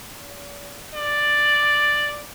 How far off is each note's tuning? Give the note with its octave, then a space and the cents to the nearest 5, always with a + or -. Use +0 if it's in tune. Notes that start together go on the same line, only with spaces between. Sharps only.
D5 -45
D5 +5